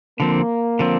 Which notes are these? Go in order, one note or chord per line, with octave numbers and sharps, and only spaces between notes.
D3 F3 A#3 C4
D3 F3 C4